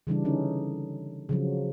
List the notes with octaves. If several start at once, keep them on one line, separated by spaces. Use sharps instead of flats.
C#3 E3 G3 D4
D3 C#4 D#4
C#3 F3 F#3